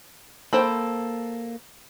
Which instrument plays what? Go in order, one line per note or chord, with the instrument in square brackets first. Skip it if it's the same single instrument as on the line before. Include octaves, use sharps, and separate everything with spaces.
[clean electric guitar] A#3 A4 [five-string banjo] C5 G5 B5